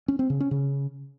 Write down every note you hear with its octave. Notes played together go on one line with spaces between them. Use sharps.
C#4
C4
C#3
C#4
C#3